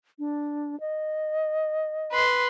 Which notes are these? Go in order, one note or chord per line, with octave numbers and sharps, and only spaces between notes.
D4
D#5
B4 C6